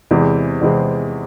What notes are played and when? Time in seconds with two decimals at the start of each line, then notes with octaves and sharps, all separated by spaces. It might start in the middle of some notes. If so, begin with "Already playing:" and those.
0.11 E2 C3 E3 G#3 C4
0.61 E2 C3 E3 G#3 C4